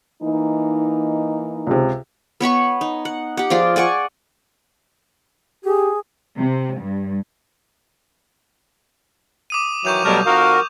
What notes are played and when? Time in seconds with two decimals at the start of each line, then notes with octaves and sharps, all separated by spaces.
0.22 E3 A#3 D#4
1.67 C#2 C3
2.40 B3 C#5 B5 C#6
2.81 D#4
3.05 F#5
3.37 G4 F#5
3.50 F3 F4 G#4 D5
3.76 D5 F#5 G#5 C#6
5.65 G4 G#4
6.37 C3
6.77 G2
9.50 D6 D#6 D#7
9.85 D#3 E3 F#3 C#6 G6 F7
10.05 B2 F#3 G3 A3 A#4
10.26 F2 D#4 F#4 A#4 F5